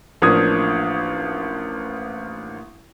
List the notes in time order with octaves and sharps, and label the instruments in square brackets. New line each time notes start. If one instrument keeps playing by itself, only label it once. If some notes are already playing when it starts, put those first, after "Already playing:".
[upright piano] A1 F3 A#3 D4 D#6 G#6